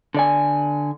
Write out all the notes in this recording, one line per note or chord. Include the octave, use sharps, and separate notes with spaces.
D3 D5 G#5